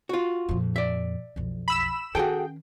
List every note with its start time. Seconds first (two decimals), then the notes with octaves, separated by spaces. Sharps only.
0.09 F4 F#4
0.49 F2 A#2
0.76 D5 E5
1.36 B1 F2
1.68 B5 E6 E7
2.15 D#3 C#4 F#4 G#4 A4 G5